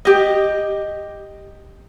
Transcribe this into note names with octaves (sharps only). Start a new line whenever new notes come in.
G4 D#5